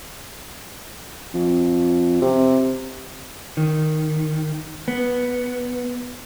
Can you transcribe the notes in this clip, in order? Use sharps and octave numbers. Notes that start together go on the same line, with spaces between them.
F2
C3
D#3
B3